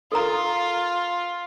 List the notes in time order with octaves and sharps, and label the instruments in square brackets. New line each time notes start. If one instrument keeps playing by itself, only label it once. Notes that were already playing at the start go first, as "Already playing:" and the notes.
[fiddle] F4 [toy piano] A4 A#4 A#5